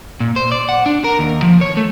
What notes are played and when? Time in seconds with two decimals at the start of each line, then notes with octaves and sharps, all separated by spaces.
0.20 A#2
0.36 C5
0.52 D5
0.69 F#5
0.86 D4
1.04 A#4
1.19 D#2
1.43 F3
1.61 C#5
1.77 A3